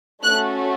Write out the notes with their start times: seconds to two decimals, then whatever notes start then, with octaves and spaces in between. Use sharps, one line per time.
0.23 A3 C#4 F#4 A4 F#6